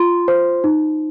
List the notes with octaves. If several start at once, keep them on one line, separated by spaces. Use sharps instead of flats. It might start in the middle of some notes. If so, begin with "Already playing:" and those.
Already playing: F4 C6
C5
D#4